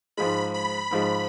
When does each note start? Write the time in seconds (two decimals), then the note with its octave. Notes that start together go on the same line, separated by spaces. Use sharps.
0.17 G#2 F3 G#3 B5
0.54 B5
0.91 G#2 F3 G#3